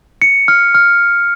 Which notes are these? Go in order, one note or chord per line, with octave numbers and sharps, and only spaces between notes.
C#7
F6
F6